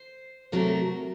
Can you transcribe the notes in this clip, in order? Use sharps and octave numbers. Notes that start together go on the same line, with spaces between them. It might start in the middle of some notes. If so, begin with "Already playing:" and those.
Already playing: C5
C3 F#3 A3 A#4